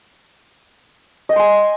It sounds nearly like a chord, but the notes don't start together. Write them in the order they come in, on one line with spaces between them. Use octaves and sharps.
D#5 G5 C6 G#5